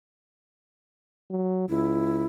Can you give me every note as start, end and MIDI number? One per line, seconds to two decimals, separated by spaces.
1.30 1.68 54
1.69 2.25 37
1.69 2.26 64